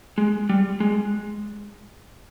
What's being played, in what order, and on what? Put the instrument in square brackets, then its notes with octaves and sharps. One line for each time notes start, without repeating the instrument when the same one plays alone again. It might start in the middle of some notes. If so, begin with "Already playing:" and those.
[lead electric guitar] G#3
G3
G#3